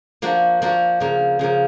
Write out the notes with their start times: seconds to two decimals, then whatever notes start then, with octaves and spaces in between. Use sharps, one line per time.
0.22 F3 A#3 D4 F#4
0.62 F3 A#3 D4 F#4
1.00 C#3 F3 A#3
1.39 C#3 F3 A#3